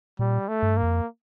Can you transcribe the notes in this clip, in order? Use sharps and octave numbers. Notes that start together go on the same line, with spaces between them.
A#2 G3
A3
G2
A#3
F2